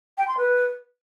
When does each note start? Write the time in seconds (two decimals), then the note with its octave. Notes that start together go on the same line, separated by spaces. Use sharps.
0.18 G5
0.28 C6
0.38 B4